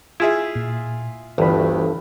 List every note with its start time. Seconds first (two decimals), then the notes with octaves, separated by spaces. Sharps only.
0.20 E4 F4 G#4 E5
0.56 A#2
1.38 G1 D2 G2 E3 B5